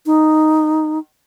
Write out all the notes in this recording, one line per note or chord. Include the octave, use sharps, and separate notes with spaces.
D#4